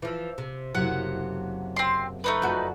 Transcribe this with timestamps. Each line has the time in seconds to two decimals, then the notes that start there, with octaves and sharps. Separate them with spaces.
0.02 E3 F3 D6 E6
0.38 C3
0.75 F#1 C3 F#3 G4 C5 F#5
1.76 C4 C6
2.24 A3 D#4 B4
2.42 F2 G3 F#4